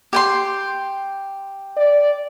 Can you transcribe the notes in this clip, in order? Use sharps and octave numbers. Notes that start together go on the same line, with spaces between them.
G4 G5 C6
D5